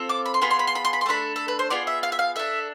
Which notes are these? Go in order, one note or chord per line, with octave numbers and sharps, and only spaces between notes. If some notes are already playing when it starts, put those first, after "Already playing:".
Already playing: C4 F4 A4
D6
B5
C6
B3 F4 G#4 B5
C6
B5
C6
B5
C6
B5
C6
A3 D4 A4 B5
A4
B4
C5
B3 F4 G#4 D5
E5
F5
E5
F5
D4 A4 E5